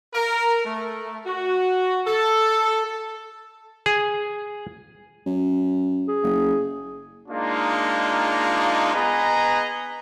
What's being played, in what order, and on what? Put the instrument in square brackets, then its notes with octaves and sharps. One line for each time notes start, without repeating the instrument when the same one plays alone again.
[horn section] A#4
A3
F#4
A4
[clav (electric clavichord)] G#4
[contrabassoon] F#2
[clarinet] G#4
[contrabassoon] F#1
[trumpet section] G#3 A#3 D4 D#4 F4
B3 G#4 B4 D#5 G#5 A#5